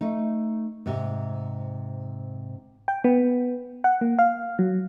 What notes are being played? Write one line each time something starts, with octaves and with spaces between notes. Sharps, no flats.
A3 D#4
G#2 C3
G5
B3
F#5
A#3
F5
F#3